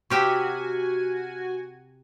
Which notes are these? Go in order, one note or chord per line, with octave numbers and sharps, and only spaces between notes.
C3 F#4 G4 E5 G#5 C#6 F6 B6